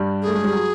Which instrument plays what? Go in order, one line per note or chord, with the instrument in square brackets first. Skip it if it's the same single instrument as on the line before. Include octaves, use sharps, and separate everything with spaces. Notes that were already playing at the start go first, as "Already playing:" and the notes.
Already playing: [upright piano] G2 G3
[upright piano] A3 [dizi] G#4
[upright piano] G#3
G3
F#3